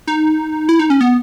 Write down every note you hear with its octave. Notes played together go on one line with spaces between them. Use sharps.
D#4
E4
D#4
C#4
B3